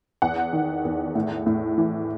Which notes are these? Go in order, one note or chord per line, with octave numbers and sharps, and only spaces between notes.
E2 F#5
D#3
E2
A2
A2
E3